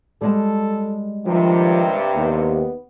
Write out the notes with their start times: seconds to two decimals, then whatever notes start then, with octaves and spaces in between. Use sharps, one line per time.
0.21 G3 G#3 A4 A5
1.26 G2 C3 D#3 F3
2.15 D#2 B3